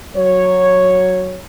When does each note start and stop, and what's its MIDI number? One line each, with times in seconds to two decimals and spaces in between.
0.16 1.44 54
0.16 1.44 73